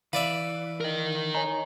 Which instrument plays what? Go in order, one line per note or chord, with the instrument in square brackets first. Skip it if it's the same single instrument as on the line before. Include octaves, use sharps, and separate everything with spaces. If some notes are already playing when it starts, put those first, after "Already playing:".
[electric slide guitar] E3 [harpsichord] B4 D5 E5 [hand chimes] F5
[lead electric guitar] A#4 D#5
[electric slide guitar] D#4 [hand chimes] C#5 G#5 A#5